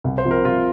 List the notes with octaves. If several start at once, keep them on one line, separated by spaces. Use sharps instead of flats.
C2
C5
C3 F3 C4
A#4
C2 F4